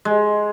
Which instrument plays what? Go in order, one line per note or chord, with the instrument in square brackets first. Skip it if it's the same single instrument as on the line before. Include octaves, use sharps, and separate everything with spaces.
[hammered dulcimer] G#3